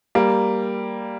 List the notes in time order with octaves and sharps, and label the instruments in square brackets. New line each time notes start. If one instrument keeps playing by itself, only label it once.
[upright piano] G3 A#3